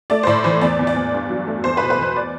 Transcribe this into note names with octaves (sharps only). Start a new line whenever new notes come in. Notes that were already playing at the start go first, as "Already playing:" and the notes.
A3 D5
C5
A2 D5
E3 C5
E2 D5
E2
D5
E2
G2
F#3
A3
E2 C5
B4
B2
B4
E2 C5
D5